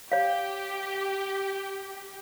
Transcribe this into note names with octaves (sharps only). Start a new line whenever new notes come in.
G4 C#5 F5